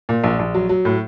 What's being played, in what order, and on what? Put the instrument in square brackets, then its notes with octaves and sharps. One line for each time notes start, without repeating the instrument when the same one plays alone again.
[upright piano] A#2
A#1
A#1
F#3
F#3
A2